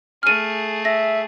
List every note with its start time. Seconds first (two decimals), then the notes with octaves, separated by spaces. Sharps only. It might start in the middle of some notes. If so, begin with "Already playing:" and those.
0.23 A3 G#4 F6 D#7
0.85 E5 A#6